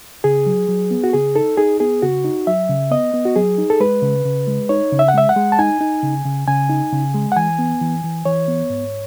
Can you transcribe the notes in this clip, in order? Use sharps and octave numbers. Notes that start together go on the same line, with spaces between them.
C#3 G#4
F#3
F#3
B3
F#4
C#3 G#4
D#4 A4
D#4 G#4
B3 G#4
C#3 F#4
D#4
F#3 E5
C#3
B3 D#5
B3
F#4
F#3 G#4
D#4
A4
G#3 B4
C#3
C#3
G#3
D#4 C#5
C#3
E5
F#5
G#3 E5
F#5
G#3
A5
D#4 G#5
D#4
C#3
C#3
C#3 G#5
D#4
C#3
G#3
F#5
E3 G#5
B3
E3
E3
E3 C#5
B3
G#2